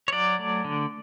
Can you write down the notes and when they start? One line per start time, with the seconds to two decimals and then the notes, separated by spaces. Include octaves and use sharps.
0.08 C#5
0.13 F#3 D5
0.39 A3
0.65 D3